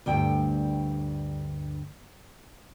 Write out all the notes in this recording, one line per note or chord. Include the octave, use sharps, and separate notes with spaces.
D2 G2 G5